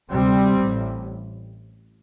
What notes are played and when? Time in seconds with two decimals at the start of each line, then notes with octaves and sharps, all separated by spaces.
0.10 D2 C3 G3 C4
0.60 A1 A2